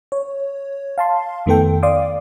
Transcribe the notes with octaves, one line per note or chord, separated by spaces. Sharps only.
C#5
F5 A5 C6
F2 D#3 A3 B3 A4 G5
D5 F5 C6 D6 D#6